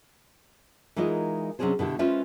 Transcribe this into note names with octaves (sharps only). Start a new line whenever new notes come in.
E3 G#3 D#4 F4 A#4 D#5
C3 F#3 C#4 D4 G#4 C5
B2 D3 E4 G4
G#3 C#4 F4 B4 C5 E5